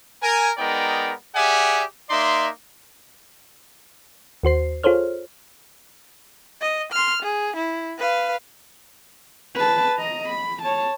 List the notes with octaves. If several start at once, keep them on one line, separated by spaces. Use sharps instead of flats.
A#4 G#5
G#3 B3 D#4 A#4 D5 G5
G4 G#4 D5 E5 F#5 G#5
A#3 D#4 D5 E5 C6
D#2 F#4 C5 C7
F4 G#4 A4 C5 C#5 F6
D#5
C6 F6
G#4
E4
B4 F5
B4 A5
D#5 A#5
B5
C#5 A5